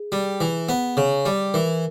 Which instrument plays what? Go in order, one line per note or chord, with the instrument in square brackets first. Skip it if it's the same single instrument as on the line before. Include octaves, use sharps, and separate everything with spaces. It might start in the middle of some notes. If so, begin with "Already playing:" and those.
Already playing: [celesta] G#4
[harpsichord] G3
E3
B3
C#3
G3
[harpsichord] E3 [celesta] A#4